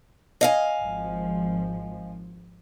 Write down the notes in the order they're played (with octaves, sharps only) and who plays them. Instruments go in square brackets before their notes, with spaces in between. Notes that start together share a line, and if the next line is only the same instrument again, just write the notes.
[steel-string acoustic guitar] D#5 F5 G#5
[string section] G#1 F3